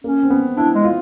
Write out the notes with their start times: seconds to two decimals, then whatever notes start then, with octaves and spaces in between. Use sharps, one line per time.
0.04 A#3 C#4
0.23 C4
0.30 B3
0.57 D4 E4
0.75 G#3
0.84 F4